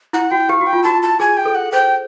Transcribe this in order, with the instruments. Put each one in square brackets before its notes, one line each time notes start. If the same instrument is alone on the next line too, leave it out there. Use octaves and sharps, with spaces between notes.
[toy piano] E4 [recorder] F#5
[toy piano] F#4 [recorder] G5
[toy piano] G4 [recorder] F5
[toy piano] F#4
[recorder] G5
[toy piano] F4
[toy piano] F#4 [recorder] A5
[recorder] A5
[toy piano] G#4 [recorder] G#5
[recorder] G5
[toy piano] A4
[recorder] F#5
[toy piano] C5 [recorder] G5